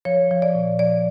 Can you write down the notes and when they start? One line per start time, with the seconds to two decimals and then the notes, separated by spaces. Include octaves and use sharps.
0.05 F3 C#5
0.31 F3
0.42 D5
0.55 A#2
0.79 F3 D5